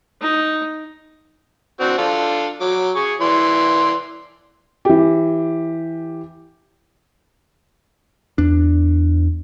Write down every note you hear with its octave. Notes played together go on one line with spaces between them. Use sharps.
D#4
C4 D4 F#4
D4 F4 A4
F#3 D6
G#4 C#6
E3 D5 C6
E3 G4
E2 D4